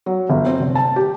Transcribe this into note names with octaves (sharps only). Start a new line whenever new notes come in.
F#3
G1
C4
F1
A5
G4